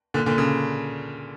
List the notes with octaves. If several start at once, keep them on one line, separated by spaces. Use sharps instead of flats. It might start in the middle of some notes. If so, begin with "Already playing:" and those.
A#2 D3
A#2 D3
C#3